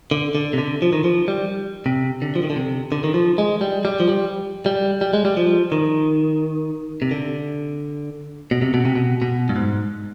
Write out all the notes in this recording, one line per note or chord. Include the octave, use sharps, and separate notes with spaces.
D3
D3
C3
D3
F3
D#3
F3
G3
C3
D3
F3
D#3
D3
C3
D3
D#3
F3
G#3
G3
G3
F3
G3
G3
G3
G#3
G3
F3
D#3
C3
D3
B2
C3
B2
C3
B2
B2
G2
G#2